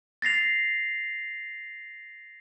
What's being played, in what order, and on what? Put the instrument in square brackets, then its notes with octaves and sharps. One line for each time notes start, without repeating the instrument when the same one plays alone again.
[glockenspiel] A6 A#6 C7 F7